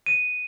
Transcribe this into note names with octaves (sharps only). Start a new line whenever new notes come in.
D#7